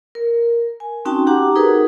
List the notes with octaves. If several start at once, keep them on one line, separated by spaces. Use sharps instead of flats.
A#4
G#5
C4 C#4 D#4 F#4 G5 A5
F#4 G4 F#5 A#5 D6
D#4 G#4 A#4 B4